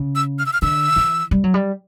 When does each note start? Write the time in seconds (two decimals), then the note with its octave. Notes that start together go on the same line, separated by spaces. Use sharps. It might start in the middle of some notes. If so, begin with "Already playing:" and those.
Already playing: C#3
0.16 E6
0.39 F6
0.46 E6
0.53 F6
0.62 D3 E6
0.96 E3
1.31 G3
1.44 F#3
1.54 G3